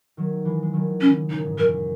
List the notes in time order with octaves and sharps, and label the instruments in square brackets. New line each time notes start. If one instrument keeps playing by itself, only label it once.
[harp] D#3 F#3
E3 G#3
G#3
D#3 F#3
[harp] C#3 E3 [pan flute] C#4
[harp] A#2 C#3 [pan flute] D#4
[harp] G#2
[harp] F#2 A#2 [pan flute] A#4